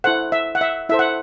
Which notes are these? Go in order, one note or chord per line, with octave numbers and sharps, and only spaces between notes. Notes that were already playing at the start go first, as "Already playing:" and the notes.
E4 A4 C5 F#5
E5
F#5
E5
E4 A4 C5 E5
F#5